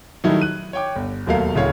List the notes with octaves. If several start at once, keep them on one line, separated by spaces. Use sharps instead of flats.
D#3 F#3 G3 A3 D#4 E4
F#6 D#7
C#5 G5 D6
G1
E1 D#2 F#3 A3 A#4 F5
D1 C#3 E4 A#4 C#5 F5